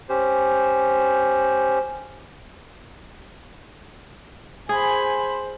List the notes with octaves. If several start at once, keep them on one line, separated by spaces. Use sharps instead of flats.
C#4 G4 C5
G#4 C5 G#5 B5